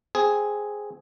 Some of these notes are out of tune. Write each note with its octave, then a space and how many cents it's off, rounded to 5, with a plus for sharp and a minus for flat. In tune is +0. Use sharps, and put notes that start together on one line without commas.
C4 +0 G#4 +0